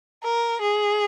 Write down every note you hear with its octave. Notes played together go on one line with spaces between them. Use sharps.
A#4
G#4